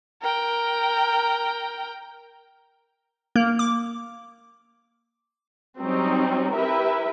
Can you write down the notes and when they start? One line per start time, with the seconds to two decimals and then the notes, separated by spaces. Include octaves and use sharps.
0.22 A#4 G5
3.36 A#3
3.59 D6
5.80 F#3 G3 C4 C#4 D#4
6.54 E4 G4 A#4 B4 E5